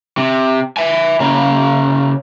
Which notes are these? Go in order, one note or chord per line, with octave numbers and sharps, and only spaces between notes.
C3
E5 G#5
C#3 A#3